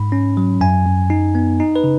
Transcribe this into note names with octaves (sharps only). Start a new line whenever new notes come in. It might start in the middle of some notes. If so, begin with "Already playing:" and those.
Already playing: G#2 B5
C#4
F#3
F#2 G#5
F#2
D#4
B3
D#4
B4
C#3